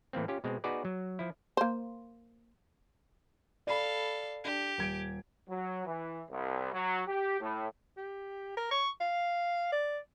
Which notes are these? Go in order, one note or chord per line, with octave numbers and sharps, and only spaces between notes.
A2 E3 A#3 C4
C#4 F4 G4
B2 G#3 C4
B3 D#4 F#4 G#4 B4 D5
F#3
F3 E4
A#3 C5
A4 D5 F5 B5
D4 G4
D#1 G#6 D7
F#3
E3
C2
F#3
G4
A2
G4
A#4
C#6
F5
D5